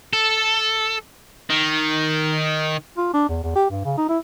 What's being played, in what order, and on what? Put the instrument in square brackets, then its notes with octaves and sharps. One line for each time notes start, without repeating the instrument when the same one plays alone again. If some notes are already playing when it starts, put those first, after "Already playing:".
[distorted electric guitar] A4
D#3
[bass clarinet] F4
D4
E2
E2
G4
G2
C#3
D#4
E4